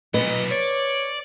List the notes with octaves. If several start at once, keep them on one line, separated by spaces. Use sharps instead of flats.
B1 A#2 B4 D#5
C#5 D5